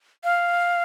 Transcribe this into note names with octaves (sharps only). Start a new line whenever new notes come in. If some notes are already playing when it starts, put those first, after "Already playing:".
F5